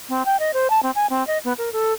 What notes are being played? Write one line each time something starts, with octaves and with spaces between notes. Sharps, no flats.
C4
G5
D#5
C5
A5
C4
G#5
C4
D#5
B3
A#4
A4